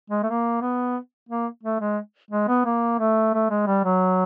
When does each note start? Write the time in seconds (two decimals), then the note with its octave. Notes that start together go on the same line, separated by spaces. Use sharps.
0.10 G#3
0.23 A3
0.26 A#3
0.61 B3
1.29 A#3
1.63 A3
1.80 G#3
2.31 G#3
2.48 B3
2.65 A#3
2.99 A3
3.34 A3
3.50 G#3
3.67 G3
3.84 F#3